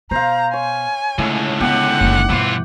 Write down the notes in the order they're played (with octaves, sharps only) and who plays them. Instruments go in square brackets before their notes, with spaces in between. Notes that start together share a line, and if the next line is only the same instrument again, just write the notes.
[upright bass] B2 [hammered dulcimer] C5 F5 [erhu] A#5
[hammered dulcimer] C#5 [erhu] G#5
[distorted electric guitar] C#2 D3 [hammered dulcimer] A2 [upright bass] A3
[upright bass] B3 [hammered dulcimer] G4 [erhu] F#5
[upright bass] F#1 D#3
[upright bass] G2 B2 [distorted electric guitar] E3 F4